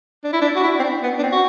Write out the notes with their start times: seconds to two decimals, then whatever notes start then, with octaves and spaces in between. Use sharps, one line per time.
0.24 D4
0.33 E4
0.42 D4
0.56 F#4
0.63 E4
0.79 C4
0.83 D4
1.03 B3
1.19 D4
1.23 C4
1.32 F#4